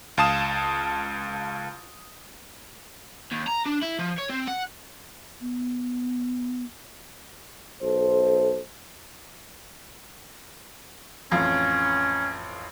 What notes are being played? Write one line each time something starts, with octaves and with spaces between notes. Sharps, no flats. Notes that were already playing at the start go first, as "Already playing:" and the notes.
C#2 F5 A5 D#6 E7
D#2
A#5
D4
E4
F3
C#5
C4
F#5
B3
B1 A4 C5
A1 F2 C#4 F4